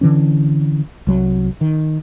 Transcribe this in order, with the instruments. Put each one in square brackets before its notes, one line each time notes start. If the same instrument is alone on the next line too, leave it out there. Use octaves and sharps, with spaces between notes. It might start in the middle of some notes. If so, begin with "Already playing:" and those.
[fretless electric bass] D3 E3 C#4
C2 F#3
D#3